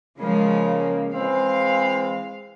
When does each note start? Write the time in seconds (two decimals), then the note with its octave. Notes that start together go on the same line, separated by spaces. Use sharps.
0.19 C#3 F3 G#3 A#3
1.13 E3 G#3 C4 F5